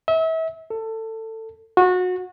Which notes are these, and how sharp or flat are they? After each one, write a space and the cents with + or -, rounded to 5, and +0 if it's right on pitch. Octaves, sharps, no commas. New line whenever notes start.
E5 -35
A4 +20
F#4 -25